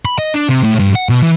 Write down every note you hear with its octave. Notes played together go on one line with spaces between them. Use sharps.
B5
D#5
D4
C3
A2
G2
F#5
B2
E3